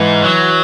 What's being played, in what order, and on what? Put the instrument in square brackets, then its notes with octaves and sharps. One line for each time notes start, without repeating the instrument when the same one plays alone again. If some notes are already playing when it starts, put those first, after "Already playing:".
Already playing: [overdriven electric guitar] G#2 [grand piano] E3
[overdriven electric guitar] F#3